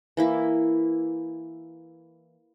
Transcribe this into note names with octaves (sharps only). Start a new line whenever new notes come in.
E3 A#3 E4